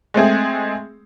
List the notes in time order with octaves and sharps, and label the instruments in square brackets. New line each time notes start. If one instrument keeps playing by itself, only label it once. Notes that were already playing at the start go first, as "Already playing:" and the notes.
[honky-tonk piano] G#3 A3 C4 G#4